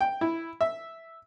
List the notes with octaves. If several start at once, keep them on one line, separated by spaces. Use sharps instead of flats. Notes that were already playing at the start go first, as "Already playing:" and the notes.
G5
E4
E5